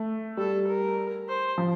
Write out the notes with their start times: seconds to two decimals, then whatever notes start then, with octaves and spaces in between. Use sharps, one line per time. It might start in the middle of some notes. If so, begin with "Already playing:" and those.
Already playing: A3
0.37 G3 A4
0.67 A#4
1.28 C5
1.58 F3